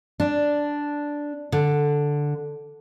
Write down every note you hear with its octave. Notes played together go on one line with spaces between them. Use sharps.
D4
D3